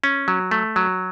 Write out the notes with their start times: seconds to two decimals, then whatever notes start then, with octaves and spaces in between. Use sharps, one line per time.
0.04 C#4
0.28 F#3
0.51 A3
0.76 F#3